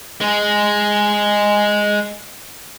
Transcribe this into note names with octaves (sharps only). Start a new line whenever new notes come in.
G#3 G#4